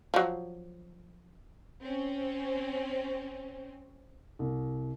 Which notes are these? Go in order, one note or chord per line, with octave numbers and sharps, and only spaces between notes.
F3 F#3
C4 C#4
C2